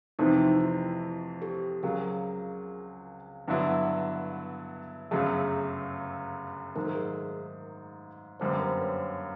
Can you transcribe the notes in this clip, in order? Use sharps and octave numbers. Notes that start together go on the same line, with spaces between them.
F2 C3 E3 A3 C4 D#4
E4
G4 A4
C#2 C#3 F#3 G#4 A#4
G2 D3 F#3 B3 E4
G1 F#2 C#3 F#3 A3 G#4
G#2 D#3 F#3 A3 A#4
A4
G#4 A#4
G1 F#2 D3 G3 A#3 C5
B4
A#4 C5
B4 C#5